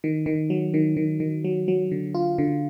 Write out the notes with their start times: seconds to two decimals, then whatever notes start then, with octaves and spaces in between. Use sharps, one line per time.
0.04 D#3
0.26 D#3
0.50 F#3
0.74 D#3
0.97 D#3
1.20 D#3
1.45 F#3
1.68 F#3
1.92 D3
2.15 F4
2.38 D3